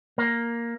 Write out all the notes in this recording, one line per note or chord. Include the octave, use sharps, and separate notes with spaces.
A#3